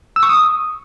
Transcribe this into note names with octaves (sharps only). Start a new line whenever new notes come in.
E6
C#6
D#6